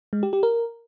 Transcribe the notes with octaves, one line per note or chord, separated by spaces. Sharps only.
G#3
G4
G4
A#4